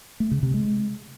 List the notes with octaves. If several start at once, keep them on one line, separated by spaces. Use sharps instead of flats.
A3
C#3
C3
G#3